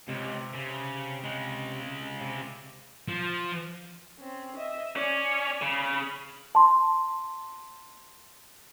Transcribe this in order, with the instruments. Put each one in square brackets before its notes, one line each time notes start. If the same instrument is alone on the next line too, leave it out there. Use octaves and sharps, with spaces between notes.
[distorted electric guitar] C#2 [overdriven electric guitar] C3
[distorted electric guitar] C#3
C#3 G#3
[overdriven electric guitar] C3
[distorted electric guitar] F3
[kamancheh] C4 C#4
D#5 E5
[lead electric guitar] C#4 [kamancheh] D5 G#5
[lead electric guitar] C#3 [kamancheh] B5
[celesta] A5 C6